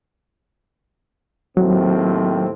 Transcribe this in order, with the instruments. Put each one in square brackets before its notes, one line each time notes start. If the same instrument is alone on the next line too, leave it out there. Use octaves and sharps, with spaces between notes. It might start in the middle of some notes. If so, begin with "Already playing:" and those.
[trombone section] D#2 A2 C4 [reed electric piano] F#3